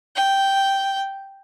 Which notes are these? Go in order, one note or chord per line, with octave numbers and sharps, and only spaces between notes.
G5